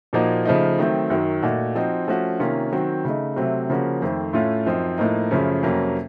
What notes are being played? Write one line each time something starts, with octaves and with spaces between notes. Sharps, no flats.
A#2 F3 A#3 D#4 F#4
C#3 F3 A3 D#4
D#3 F#3 A3 C4
F#2 D#3 F#3
A#2 A3 D#4 F#4
F3 C4 D#4 F#4
F3 A3 C#4 F#4
C3 D#3 A#3 C#4 F4
D#3 F#3 C4 F#4
C#3 A3 D#4
C3 F#3 A3 C4
C#3 F3 A#3 C#4 F#4
F2 D#3 A3 C4
A2 A3 C#4 F4
F#2 F3 C4 D#4
A2 F3 A#3 D#4
F#2 C#3 F3 A3 C#4
F2 C3 F#3 A#3 C#4